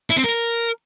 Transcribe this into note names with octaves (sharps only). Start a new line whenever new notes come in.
E4
C4
A#4